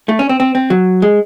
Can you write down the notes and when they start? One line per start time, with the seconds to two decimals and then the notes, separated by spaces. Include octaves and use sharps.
0.09 A3
0.19 C#4
0.29 C4
0.40 C4
0.55 C4
0.70 F#3
1.02 G#3